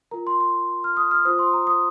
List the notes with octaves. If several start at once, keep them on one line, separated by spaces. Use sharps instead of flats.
F4 A#4 A#5
C6
C6
F6
D#6
F6
F4 C5 D#6
C6
A#5
D#6